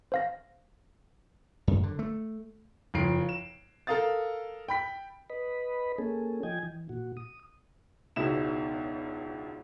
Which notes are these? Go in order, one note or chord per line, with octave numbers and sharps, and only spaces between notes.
C5 F5 A#6
F#2
D3
A3
F#1 F2 C7 D7
E7
A4 A#4 F5 D#6 A6
G5 B5 B6
B4 D#5 B5
A#3 C#4 G#4 A4
F3 D#5 G5 G#5 G#6
E3
A#2 F#4
D#6
E1 C#2 B2 D#4 E4 E7